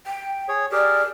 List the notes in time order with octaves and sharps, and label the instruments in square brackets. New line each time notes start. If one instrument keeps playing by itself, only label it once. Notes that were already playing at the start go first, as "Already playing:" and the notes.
[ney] G5
[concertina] G#4 C#5
[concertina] G4 G#4 A#4 [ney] D5